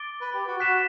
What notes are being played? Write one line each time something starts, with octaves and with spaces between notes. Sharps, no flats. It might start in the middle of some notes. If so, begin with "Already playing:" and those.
Already playing: D6 A6 D7 G7
B4
G4
F#4
F#4 F#6 B6 E7